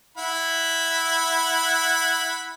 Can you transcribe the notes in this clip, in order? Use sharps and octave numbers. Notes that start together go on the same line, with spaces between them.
E4 F#5 B5